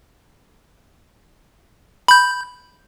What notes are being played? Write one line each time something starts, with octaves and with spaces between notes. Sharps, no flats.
B5 G6